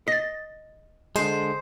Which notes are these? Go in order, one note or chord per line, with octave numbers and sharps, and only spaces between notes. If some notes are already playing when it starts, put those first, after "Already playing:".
D#5 A6 A#6
D3 G#3 C5